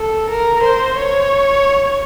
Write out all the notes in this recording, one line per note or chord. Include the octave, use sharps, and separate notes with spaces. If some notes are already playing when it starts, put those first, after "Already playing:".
Already playing: A4
A#4
C5
C#5